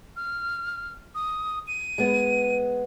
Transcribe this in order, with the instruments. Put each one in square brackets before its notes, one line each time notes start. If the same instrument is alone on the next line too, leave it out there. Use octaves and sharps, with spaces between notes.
[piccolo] F6
D#6
D#7
[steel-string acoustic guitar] G#3 B3